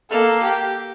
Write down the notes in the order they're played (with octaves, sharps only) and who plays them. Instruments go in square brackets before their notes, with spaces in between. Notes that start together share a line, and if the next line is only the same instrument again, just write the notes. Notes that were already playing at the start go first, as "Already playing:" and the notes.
[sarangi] A#3 [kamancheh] A4
[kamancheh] G4